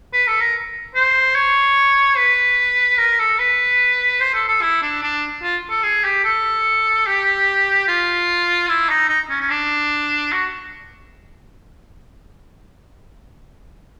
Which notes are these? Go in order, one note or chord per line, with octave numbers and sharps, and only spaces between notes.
B4
A4
A#4
C5
C#5
B4
A#4
A4
B4
C5
A4
A4
E4
D4
D4
F4
A4
G#4
G4
A4
G4
F4
E4
D#4
D#4
C#4
C#4
D4
F#4